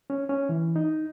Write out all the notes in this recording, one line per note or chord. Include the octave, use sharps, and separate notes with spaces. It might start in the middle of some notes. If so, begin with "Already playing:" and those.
C#4
C#4
E3
D#4